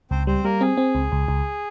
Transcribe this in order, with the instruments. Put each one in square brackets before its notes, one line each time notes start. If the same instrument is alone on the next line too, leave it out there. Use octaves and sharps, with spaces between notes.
[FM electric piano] C#2 [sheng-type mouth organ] C4 C5
[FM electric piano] G3 [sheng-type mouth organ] C4 C5
[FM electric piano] G3 [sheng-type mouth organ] A#3 A#4
[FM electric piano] C4 [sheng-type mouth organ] G#4
[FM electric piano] C4
C#2
C#2
C#2